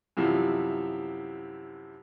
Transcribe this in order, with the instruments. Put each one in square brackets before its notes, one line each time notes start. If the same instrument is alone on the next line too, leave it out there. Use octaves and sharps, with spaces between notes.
[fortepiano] F#2 C3 E3 F3